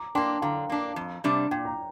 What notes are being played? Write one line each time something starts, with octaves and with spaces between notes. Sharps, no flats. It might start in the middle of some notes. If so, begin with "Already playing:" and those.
Already playing: A#5 D6
A#3 D4 G5 C6
D3 F5 A#5
A#3 D4
F2
C3 G3 D4
A#2 G5
A#5